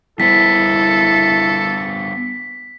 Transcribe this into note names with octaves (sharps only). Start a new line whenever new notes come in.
G3 B3 E4 A4 C5 B6